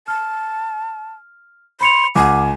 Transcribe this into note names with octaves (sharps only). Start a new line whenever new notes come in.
A5 F6
B5 C6 C#7 F7
C#2 F#5 G#5 D6